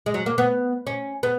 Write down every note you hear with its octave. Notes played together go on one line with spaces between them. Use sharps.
G#3
F#3
A#3
B3
C#4
B3